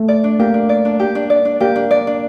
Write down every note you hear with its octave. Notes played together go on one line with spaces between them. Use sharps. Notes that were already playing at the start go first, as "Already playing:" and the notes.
Already playing: A3
D5
D4
A#3 G4
D4
D5
D4
G4
D4
D5
D4
A#3 G4
D4
D5
D4